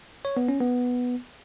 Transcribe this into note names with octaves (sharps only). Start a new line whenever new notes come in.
C#5
B3
C#4
B3